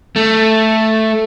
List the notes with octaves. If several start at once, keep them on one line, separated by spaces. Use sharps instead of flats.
A3